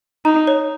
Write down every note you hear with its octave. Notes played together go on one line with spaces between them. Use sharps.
D#4 A#5
C#5